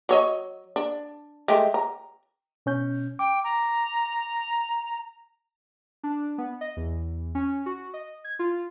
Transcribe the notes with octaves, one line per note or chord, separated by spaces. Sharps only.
F#3 C#5 D#5
D4
G#3 A3 G4
A#5
B2 C#4 G6
G5 D6
A#5
D4
B3
D#5
E2
C#4
F#4
D#5
G#6
F4